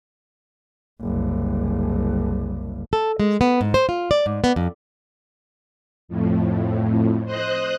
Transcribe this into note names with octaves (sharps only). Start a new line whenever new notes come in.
F#1 C2
A4
G#3
B3
G#2
C5
F4
D5
G#2
B3
F2
F2 A2
C5 D#5 F#6